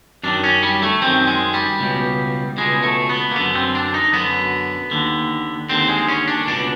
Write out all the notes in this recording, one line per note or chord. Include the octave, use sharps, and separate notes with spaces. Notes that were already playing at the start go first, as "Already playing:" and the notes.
F#2 D#3 D4
C#4
G3
A3
F#2 D#3 C4
G#3
G3
C#2 B2
C#2 B2 G#3
A3
B3
A#3
F#2 D3 B3
C4
D4
D#4
F#2 D3 B3
D#2 D3
D#2 D3 C4
G#3
C#4
D4
C#2 B2 D4